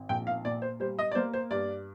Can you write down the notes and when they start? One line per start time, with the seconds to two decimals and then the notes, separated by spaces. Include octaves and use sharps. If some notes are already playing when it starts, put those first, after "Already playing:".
Already playing: G#1
0.09 A#1 G5
0.27 F5
0.45 A#2 D5
0.62 C5
0.80 G3 C5
0.99 D#5
1.12 D5
1.15 A#3 C5
1.34 C5
1.51 G2 D5